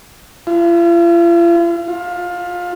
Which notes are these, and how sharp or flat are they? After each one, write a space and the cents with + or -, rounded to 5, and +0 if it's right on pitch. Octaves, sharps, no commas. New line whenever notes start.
F4 -45
F4 +20